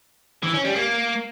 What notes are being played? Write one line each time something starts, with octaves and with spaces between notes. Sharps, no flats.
E3
C#4
G3
A#3